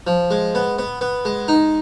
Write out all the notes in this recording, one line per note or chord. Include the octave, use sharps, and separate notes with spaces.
F3
G#3
B3
B3
B3
G#3
D#4